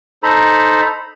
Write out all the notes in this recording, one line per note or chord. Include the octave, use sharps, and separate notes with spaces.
D#4 A4 C5 A#5 B5